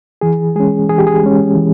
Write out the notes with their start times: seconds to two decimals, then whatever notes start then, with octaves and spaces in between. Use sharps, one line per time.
0.21 E3 G#4
0.56 G#3 C#4 G#4
0.89 E3 G#4
0.98 G4
1.07 G#4
1.23 G#3 C#4
1.56 E3